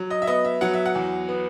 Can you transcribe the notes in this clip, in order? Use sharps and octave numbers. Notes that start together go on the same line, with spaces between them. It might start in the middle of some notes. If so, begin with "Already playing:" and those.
Already playing: F#3
D#5
E5
B3 D#5
E5
F#3 F#5
E5
F#5
E2
B3